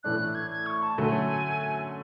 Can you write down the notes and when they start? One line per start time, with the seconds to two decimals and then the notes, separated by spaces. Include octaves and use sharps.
0.03 A2 E3 A3 D4 F#6
0.20 F#6
0.35 G#6
0.51 G#6
0.66 C#6
0.82 A5
0.98 D3 F#3 A3 C#4 G#5